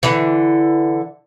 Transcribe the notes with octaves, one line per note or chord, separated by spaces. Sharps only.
D3 E3